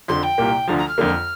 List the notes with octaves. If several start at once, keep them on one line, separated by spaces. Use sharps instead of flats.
F2 D3 F3 C6
G5
C2 A#2 A#3 G4
D2 D3 F3 A#5
A#5
F6
F2 D3 A#3